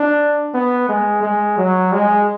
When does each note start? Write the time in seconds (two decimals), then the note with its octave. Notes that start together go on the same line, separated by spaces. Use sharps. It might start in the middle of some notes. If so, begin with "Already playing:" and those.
Already playing: D4
0.54 B3
0.89 G#3
1.23 G#3
1.58 F#3
1.92 G#3